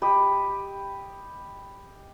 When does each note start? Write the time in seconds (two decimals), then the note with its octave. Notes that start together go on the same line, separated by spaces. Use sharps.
0.02 G4 D#5 B5